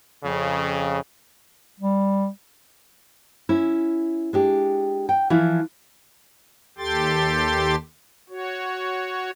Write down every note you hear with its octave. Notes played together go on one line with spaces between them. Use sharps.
F2 C#3
G3
C#4 E4
G#3 D4 G4
G5
E3 F3 E4 F4
D#2 G4 A4 G5 C6 A6
F#4 C#5